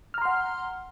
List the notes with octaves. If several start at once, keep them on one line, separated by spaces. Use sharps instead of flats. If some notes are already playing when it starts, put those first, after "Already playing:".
F#5 A#5 C6 F6